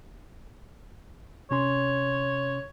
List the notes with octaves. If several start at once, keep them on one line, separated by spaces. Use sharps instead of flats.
C3 C#4 C#5 C6